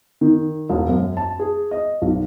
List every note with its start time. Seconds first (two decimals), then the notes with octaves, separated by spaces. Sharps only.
0.21 D#3
0.70 E1
0.89 F#2
1.17 A5
1.39 G#4
1.71 D#5
2.02 B1